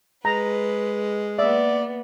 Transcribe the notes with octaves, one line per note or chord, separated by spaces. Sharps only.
G#3 B4 A#5
A#3 B3 D5 E5